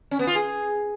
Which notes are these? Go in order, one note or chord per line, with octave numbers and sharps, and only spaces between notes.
C#4
B3
F4
G#4